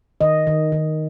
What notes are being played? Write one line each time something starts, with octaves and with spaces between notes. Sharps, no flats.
D#3 D#5
D#3
D#3